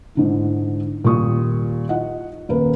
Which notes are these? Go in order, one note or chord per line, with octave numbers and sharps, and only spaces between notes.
G#2 D3 E4
D#1 A#2 G3 F4 C#6 D#6
D#4 F4 D#5 F#5
D#1 A#3 A#4 B4